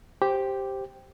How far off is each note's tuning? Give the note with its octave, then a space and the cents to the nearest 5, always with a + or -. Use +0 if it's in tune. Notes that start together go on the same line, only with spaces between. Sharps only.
G4 +0 C5 +5 G5 +0